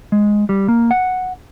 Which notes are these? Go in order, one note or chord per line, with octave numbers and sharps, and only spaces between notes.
G#3
G3
A#3
F#5